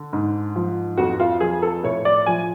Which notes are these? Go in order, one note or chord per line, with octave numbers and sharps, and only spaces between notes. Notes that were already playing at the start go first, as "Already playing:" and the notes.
Already playing: D3
G#2
F3
F2 F#4
F4
F3 G#4
A4
A2 C#5
D5
F3 G#5